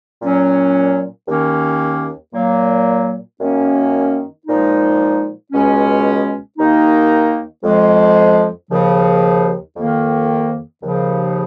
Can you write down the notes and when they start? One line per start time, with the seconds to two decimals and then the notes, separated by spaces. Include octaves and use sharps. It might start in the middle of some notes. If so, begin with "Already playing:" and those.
0.21 A#2 F#3 C#4
1.27 D#2 D#3 A#3 C#4
2.33 A#2 F#3 A#3
3.40 F#2 D#3 A#3 C#4
4.46 A#2 F3 G#3 D#4
5.52 C#2 B2 G#3 C#4
6.58 D#2 D#3 A#3 D#4
7.63 F2 F3 G#3
8.70 D#2 C#3 F3
9.76 F2 D#3 A#3
10.82 D#2 C#3 F3